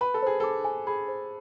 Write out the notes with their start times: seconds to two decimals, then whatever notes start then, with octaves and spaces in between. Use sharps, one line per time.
0.01 B4 B5
0.14 A4
0.23 G#4 C5
0.40 A4 D6
0.65 G#5
0.87 G#4 B5
1.08 C5